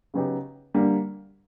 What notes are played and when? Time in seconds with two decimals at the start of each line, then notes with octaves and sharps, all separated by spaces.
0.14 C#3 F#3 B3 D#4 G4
0.74 D3 G3 A#3